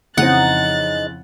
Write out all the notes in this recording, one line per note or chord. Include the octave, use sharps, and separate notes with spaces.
F2 C#3 E3 C4 D#4 F#5 F#6 A6